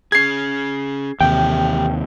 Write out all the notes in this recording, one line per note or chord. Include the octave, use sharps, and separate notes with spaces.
C#4 G#4 G#6 C7
D#2 C3 E3 G4 E5 G5